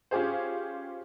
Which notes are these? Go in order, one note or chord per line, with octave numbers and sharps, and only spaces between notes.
C#4 F4 G4 G#4 C5